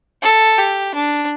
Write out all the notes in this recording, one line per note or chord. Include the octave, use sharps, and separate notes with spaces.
A4
G4
D4